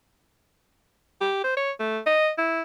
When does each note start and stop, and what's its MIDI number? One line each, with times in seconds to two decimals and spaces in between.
1.21 1.41 67
1.44 1.56 72
1.57 1.71 73
1.80 1.99 57
2.07 2.30 75
2.38 2.63 64